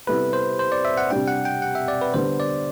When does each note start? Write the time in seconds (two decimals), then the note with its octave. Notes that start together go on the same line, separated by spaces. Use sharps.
0.07 C3 G3 B3 E4 A4 B4
0.33 C5
0.59 C5
0.72 D5
0.85 E5
0.98 F#5
1.10 C3 G3 D4 G5
1.28 F#5
1.45 G5
1.62 F#5
1.75 E5
1.88 D5
2.01 B4
2.14 D3 G3 B3 C5
2.40 D5